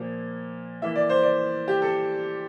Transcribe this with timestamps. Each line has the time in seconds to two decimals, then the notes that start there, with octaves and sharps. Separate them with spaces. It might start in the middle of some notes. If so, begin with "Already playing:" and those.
Already playing: A#2 F3 A#3
0.82 E3 A#3 E5
0.96 D5
1.09 C5
1.23 D5
1.68 G4
1.82 A4